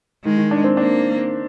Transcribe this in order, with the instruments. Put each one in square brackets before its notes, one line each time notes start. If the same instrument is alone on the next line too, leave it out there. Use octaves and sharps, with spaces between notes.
[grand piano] D#3 [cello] G#3
[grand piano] D#3
D4
C4
[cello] A#3 [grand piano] D4